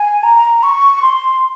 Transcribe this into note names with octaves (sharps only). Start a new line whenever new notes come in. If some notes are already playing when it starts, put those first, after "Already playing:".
Already playing: G#5
A#5
C#6
C6